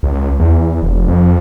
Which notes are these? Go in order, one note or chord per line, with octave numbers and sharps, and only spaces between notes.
C#2
E2
F1
F2